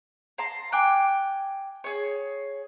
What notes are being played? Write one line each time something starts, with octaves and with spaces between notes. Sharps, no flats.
F5 A5 A#5 C6
G5 G#5 D6 F#6
G#4 C#5